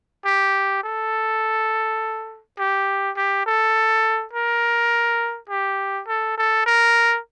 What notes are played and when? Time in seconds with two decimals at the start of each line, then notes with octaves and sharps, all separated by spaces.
0.26 G4
0.83 A4
2.58 G4
3.17 G4
3.46 A4
4.34 A#4
5.50 G4
6.08 A4
6.38 A4
6.66 A#4